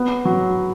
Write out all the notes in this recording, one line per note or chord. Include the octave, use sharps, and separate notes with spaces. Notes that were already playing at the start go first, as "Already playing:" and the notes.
Already playing: B3
F#3